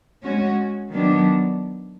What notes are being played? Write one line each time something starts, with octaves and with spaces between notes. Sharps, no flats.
G#3 C#4 F#4
D#3 F#3 B3 D4